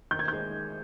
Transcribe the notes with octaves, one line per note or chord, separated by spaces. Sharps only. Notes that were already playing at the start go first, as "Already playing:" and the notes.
D#3 G6
G#6
G#3 G6